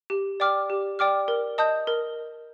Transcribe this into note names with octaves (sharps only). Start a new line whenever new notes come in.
G4
D5 G5 D6 F6
G4
D5 G5 D6 F6
A#4
D#5 A5 D#6 G6
A#4